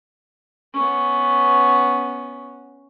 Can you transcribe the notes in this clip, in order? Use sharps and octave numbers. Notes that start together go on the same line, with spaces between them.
B3 C#4